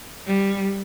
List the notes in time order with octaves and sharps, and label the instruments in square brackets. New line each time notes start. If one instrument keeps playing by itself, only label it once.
[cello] G3